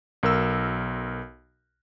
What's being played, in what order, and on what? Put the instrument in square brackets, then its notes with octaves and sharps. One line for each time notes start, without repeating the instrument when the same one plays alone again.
[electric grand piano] B1 A#4 E6